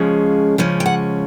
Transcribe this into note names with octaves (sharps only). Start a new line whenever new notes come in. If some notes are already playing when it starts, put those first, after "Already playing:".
Already playing: C#3 F3 G#3 C#4
C#3 F3 G#3 C#4
G5
F#5